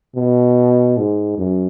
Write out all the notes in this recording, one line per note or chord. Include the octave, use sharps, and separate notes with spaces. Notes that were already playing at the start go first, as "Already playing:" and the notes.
B2
G#2
F#2